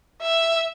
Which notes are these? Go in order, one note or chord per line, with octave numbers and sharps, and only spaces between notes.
E5